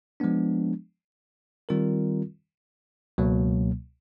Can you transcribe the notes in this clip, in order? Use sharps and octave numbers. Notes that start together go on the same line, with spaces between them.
F3 G#3 B3 D4
D#3 G3 C4 F4 A#4
C#2 B2 F#3 A#3